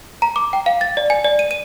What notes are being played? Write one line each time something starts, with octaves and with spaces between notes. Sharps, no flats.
A#5
D6
G5
F5
A6
D5
G#5
D5
D#7
D#7